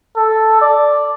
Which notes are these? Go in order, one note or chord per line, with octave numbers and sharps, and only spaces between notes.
A4
D5